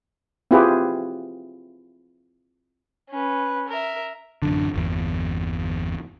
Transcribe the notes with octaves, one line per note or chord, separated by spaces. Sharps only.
C4 E4 F4 G4 G#4 B4
C#4 B4
A#4 E5
A1 F#2 D3
G1 E2